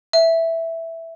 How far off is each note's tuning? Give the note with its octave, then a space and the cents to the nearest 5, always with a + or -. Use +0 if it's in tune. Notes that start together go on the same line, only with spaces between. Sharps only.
E5 +0